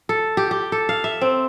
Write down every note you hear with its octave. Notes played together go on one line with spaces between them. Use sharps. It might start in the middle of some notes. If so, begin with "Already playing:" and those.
A4
G4
G4
A4
F5
E5
C4